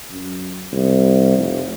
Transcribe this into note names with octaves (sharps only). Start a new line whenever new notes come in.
F#2
C2
F1